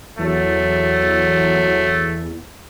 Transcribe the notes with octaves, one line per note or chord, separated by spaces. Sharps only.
E2 F#3 A3